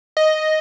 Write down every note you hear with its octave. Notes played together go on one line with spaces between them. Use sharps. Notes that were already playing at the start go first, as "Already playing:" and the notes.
D#5